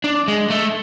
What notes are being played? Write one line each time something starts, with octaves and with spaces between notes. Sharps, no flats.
D4
G#3
A3